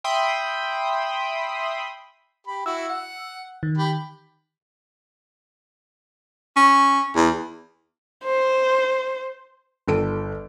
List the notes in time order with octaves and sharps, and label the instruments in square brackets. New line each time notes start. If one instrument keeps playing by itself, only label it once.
[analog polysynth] E5 G5 B5 C6 D#6
[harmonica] G4 B5
[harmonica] E4 F#4 [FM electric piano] E6
[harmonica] F#5
[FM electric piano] D#3
[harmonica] G4 B5
[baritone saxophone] C#4
E2
[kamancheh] C5
[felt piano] G1 A4 D7